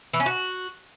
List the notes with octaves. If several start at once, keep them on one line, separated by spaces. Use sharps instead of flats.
E3
C#4
F#4